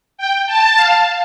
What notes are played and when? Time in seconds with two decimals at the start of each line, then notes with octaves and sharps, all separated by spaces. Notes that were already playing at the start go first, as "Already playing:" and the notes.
0.18 G5
0.47 A5
0.76 F5